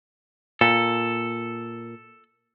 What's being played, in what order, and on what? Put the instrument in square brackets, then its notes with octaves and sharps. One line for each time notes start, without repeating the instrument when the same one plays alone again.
[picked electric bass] A#2 [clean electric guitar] A4